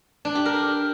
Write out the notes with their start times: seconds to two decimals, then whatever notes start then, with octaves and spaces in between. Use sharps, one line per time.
0.25 D4
0.35 G4
0.45 A#4